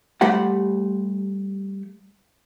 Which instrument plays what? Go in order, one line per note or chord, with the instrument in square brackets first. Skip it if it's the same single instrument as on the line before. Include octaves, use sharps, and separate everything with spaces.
[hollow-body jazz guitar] G3 A3 G4 C5 F#5